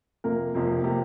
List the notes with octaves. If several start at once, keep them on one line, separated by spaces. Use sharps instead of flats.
F2 C3 A#3 F4 A#4
F1 F2 C3 F3 A#3
C3 F3 A#3 G4